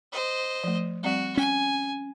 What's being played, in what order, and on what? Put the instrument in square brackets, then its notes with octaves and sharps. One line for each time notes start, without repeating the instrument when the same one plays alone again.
[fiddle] C5 D#5
[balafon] F3 A3
[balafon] G3 C4 D5 [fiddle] F#4
[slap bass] C#4 [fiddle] G#5